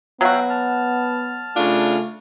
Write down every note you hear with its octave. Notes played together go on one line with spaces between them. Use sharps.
F#3 B3 F#4 E5 F5 G5
A5 F6
C#3 A3 D4 F4